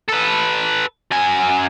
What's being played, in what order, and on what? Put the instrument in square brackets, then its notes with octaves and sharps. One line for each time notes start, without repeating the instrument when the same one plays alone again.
[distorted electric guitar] A4 B4
F#2 G#5